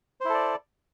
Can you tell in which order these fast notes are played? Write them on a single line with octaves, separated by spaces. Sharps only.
C5 E4 A4 D5